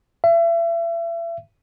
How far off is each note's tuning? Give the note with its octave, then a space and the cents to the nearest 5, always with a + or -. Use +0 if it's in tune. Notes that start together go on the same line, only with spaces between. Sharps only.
E5 +35